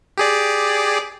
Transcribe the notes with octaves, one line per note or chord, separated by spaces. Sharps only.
G4 G#4 D5